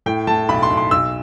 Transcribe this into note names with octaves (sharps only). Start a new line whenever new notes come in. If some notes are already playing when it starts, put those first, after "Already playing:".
A2 G5
A2 A5
B1 B5
C6
B1
C6
B1 E6